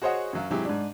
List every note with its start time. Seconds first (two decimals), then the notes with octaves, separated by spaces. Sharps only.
0.02 F#4 G#4 C5 C#5 D#5 F#5
0.33 F#2 F#3 F5
0.50 G#2 C3 F#3 E4 G4 G#4
0.65 G#2 D4